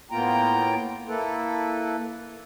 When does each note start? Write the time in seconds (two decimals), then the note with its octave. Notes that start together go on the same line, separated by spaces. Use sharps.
0.11 A2 A#3 B3 F4 G5 A#5
1.08 A#3 E4 A4 B4